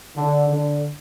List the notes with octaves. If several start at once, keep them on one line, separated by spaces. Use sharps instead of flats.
D3
D3